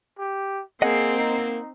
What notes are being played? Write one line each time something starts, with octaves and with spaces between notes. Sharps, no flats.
G4
A#3 C4 G#4 C5 D#5 F#5
D#4